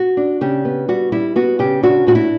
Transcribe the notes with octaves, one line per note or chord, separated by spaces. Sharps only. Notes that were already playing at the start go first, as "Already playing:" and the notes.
Already playing: F#4
D4
C#3 G4
B3
G3 F#4
G3 E4
B3 F#4
C#3 G4
D4 F#4
A2 F#4
E4